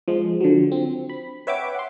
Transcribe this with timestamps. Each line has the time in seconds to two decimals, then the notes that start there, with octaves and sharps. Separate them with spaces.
0.08 F3 G#3
0.41 D3 F3 F#3
0.72 C4
1.09 B5
1.47 B4 C#5 E5 F#5 G5 D6
1.75 F#5 C6